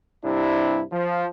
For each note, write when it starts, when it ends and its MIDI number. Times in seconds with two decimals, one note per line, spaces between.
0.24 0.82 43
0.24 0.82 48
0.24 0.82 62
0.24 0.82 64
0.92 1.27 53